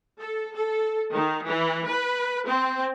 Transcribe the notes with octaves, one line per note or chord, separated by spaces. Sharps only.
A4
A4
D#3
E3
B4
C4